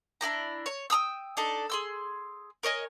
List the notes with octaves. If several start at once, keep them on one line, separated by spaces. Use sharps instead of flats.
D4 E4 G4 A#5
C#5
G5 A#5 D#6 E6
D4 D#4 A4
G#4 C6 E6
A#4 C#5 D#5 G#5